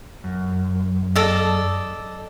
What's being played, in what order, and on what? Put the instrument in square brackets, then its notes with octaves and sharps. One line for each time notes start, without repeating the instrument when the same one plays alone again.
[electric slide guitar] F#2
[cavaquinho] A4 D5 D#5